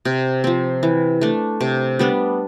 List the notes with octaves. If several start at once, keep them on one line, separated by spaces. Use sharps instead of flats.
C3
F3 C4
E3
A3 D4
C3
G3 B3 D4